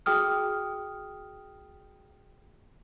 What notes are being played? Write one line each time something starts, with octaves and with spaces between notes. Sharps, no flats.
F#4 G#4 G5 D#6 F6